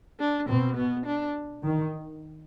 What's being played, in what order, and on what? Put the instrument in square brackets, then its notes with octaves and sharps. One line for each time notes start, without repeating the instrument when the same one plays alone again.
[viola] D4
[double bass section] B2 [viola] C4
[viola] B3
D4
[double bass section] D#3